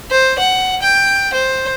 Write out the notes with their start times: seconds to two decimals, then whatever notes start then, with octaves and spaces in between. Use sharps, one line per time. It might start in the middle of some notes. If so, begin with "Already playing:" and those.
0.10 C5
0.39 F#5
0.82 G5
1.33 C5